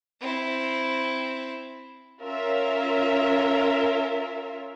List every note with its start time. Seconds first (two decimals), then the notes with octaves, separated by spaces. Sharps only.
0.21 C4 E4
2.23 C#4 F4 A#4 E5